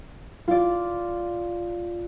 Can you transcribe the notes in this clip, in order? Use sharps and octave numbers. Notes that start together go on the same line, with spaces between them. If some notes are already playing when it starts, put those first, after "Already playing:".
F4 D5